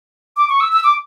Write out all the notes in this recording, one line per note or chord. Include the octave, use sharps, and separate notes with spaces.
D6
C#6
E6
E6
D6